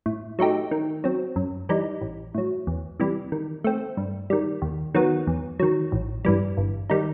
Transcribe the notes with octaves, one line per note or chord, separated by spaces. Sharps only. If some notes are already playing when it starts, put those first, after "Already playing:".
A2
F#3 A3 D#4 G4
D#3
F#3 C4
F#2
E3 G3 D#4
A1
A2 F#3
E2
C3 E3 G3
D#3
A3 C4
G2
D#3 G3
D#2
D#3 F#3 B3
E2
D#3 F#3
A1
G2 E3 G3
G1
D#3 G3 D#4